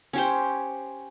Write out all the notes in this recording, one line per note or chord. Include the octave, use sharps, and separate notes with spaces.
C#4 G4 C5